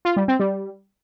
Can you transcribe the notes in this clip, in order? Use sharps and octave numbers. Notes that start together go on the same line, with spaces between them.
F4
G3
C4
G3